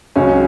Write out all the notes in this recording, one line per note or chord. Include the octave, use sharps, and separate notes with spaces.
C#2 C#3 F#3 C#4